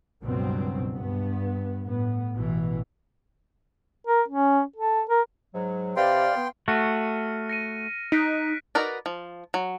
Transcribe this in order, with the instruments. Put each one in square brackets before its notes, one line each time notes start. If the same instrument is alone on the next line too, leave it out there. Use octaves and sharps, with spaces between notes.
[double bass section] C#2 G2 B2 F#3 C4
G2 B3
A2 B3
A1 B2 E3
[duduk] A#4
C#4
A4
A#4
[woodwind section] G#2 F#3
[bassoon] C3 [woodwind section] B4 D5 [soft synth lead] F5 [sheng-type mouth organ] G5 C6
[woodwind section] B3
[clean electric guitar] A3 F#4 [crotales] F6 C#7 D#7
[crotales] A#6 C#7 D#7
[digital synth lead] D#4 [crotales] F#6 B6 D7
[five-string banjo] D#4 F#4 A#4 B4 D5
F3
F#3